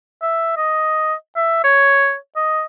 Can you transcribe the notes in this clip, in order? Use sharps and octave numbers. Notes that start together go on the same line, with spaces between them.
E5
D#5
E5
C#5
D#5